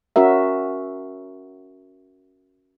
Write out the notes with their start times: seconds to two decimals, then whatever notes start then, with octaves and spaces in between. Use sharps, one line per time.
0.16 C#4 F#4 A#4 E5